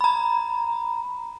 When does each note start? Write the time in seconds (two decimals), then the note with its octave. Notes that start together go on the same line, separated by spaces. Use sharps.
0.01 A#5 B5